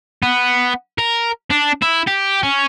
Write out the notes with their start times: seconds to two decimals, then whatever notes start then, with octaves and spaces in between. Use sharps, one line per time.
0.23 B3
0.98 A#4
1.51 D4
1.82 E4
2.07 G4
2.43 C#4